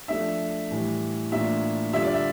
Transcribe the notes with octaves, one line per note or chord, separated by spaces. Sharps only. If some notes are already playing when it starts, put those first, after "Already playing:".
F3 A3 D4 E5
A2 E3 G3
A2 E3 A#3 D4 F4 E5
D3 G3 D4 F4 E5
D5
E5